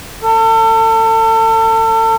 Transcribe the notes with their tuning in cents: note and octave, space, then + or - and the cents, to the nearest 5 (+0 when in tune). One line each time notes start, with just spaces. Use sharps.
A4 +35